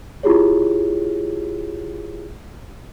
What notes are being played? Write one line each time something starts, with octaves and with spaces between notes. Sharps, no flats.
E4 F4 G4 G#4 C#5